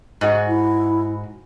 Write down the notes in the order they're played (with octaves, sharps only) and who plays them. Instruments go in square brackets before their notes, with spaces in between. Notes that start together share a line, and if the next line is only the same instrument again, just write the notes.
[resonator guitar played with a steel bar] G#2 F#4
[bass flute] E4